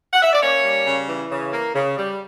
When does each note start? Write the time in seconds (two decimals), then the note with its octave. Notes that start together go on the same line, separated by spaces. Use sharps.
0.14 F#5
0.23 E5
0.33 D5
0.42 A#3 C#4 C#5
0.64 G3
0.87 C#3
1.08 E3
1.31 C#3
1.53 A#3
1.74 C#3
1.98 G3